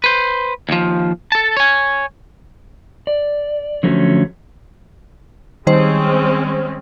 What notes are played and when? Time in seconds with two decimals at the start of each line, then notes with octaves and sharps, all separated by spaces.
0.04 B4 C5
0.69 D#2 F3
1.32 A4 A5
1.57 C#5 G#5
3.07 D5
3.83 D3 F3 F#3 A3 C4 C#4
5.67 D#3 G3 G#3 C4 C#4 C5